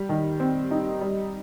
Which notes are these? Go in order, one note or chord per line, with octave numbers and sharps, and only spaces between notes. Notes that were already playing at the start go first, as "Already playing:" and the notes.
Already playing: G3
D#3
C4
D#4
G3